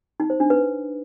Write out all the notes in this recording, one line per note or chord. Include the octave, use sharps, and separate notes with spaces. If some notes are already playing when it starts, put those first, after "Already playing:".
D#4
C5
D4
B4